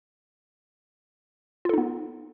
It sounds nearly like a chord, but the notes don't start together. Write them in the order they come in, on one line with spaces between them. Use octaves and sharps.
F4 A4 D#4 B3